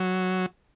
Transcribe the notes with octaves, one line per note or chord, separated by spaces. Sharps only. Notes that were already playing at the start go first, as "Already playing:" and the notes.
Already playing: F#3